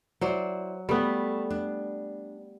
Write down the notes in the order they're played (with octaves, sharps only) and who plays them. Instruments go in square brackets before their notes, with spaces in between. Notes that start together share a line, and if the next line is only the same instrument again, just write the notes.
[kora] F#3 [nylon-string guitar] E4 C5 D5
[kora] G3 B3 [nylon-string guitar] A3
[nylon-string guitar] D4